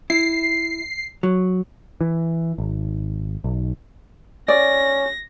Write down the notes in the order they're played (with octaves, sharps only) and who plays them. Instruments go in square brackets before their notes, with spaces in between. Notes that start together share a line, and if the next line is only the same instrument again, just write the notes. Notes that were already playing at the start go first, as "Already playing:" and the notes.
[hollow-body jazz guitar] E4 [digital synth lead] C7
[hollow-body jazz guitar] F#3
[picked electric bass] E3
G#1
B1
[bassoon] C#4 [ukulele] D5 [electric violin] A#6